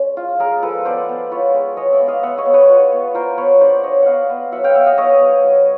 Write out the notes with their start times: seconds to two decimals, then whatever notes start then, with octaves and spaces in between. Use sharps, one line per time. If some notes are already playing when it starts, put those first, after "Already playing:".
Already playing: G#3 C#4
0.17 F4
0.40 G#3 G#4 A#4
0.62 F3 A4 B4
0.85 B3 C5 D5
1.09 B3
1.32 F4 B4 C#5
1.54 G#3
1.77 G#3 C#5 D#5
1.92 D5 E5
2.00 B3
2.08 D#5 F5
2.23 B3 E5 F#5
2.38 C#5 D#5
2.46 B3
2.53 B4 C#5
2.69 F4
2.92 B3
3.14 F4 A#4 C5
3.37 B3 B4 C#5
3.60 D4 C5 D5
3.83 D4 C#5 D#5
4.02 B3 D#5 F5 F#5
4.30 B3
4.52 F#3 E5 F#5
4.64 F5 G5
4.75 B3 E5 F#5
4.86 D#5 F5
4.98 B3 C#5 D#5
5.21 F#3
5.44 F#3